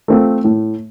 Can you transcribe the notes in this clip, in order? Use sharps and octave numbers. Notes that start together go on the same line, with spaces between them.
A3 C4 F4
A2